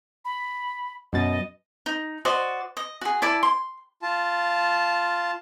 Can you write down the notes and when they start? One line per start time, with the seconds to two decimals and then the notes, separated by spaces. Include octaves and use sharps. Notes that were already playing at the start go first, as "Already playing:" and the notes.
0.25 B5
1.13 F#2 B2 D#5 A6
1.86 D#4
2.25 F#4 C5 D5 D#5
2.77 D#5
3.01 F#4 G#4
3.22 E4 D5 A5
3.43 C6
4.02 F4 A5